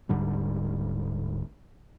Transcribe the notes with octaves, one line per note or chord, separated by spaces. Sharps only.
D1 G#2 D3 G3